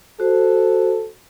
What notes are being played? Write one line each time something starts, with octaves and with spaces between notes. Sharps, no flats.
F#4 A4 C5